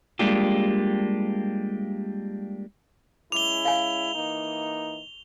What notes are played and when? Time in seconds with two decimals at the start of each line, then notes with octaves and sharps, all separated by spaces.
0.19 G3 G#3 A#3 D4 F4 G4
3.32 G#3 C#4 E4 D6 F7 G7
3.65 F5 G#5
4.15 E3 A#3 D#4